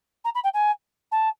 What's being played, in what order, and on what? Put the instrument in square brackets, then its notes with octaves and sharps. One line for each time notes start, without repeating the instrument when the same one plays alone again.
[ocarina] A#5
B5
G5
G#5
A5